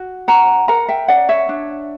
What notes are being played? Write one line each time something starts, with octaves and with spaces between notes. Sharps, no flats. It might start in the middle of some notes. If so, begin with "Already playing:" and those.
Already playing: F#4
C#4 F#5 A#5
A#4 F#5 A#5
E5 G5
C#4 D5 F#5
C#5 E5
D4